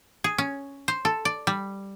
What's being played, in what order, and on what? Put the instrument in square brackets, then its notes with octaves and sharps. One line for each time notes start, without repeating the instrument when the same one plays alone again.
[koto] G#4
C#4
C5
A4
D5
G3